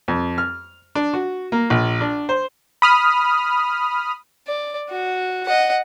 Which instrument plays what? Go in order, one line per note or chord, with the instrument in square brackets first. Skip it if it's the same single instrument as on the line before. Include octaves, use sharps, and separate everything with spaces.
[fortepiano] F2
F6
D4
F#4
A#3
A#1
D4
C5
[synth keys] B5 D#6 F6
[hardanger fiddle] D5
F#4
D#5 F#5